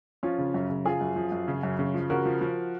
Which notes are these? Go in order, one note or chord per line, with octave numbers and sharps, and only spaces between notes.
F3 C#4 F4
C#3
F#2
C#3
F3 F4 G#4
F#2
F3
F#2
C#3
F#2
C#3
F3
C#3 F#4 A#4
F3
F3